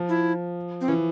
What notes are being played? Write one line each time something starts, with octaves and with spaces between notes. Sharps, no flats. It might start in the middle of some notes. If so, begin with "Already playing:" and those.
Already playing: F3
E4
C4
E3 C#4